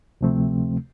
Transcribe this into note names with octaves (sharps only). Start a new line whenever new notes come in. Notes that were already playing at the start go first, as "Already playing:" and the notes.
D2 C3 F3 A3 C4